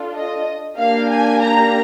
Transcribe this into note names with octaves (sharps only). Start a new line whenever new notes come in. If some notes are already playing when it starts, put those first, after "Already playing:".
Already playing: D4 F4 A4
D#5
A#3 D4 G4 F5
G#5
A#5